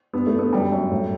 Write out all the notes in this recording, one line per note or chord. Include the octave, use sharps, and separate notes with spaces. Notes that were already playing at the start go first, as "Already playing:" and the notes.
G2 B3
A3
G2
B3
F#2 G3
F#2
A2